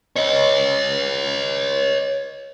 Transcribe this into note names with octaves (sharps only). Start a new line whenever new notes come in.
C#5 D#5